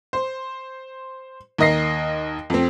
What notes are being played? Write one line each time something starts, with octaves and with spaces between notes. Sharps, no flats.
C5
D#2 A#4 D#5 A#6 C7
F2 C4